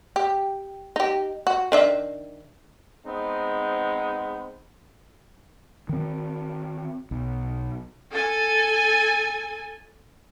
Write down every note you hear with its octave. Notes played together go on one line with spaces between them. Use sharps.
G4
D#4 G4
F#4
D#3 D4 E5
G#3 B3 C4 D#4
D#3 C4
B1
A4 G#5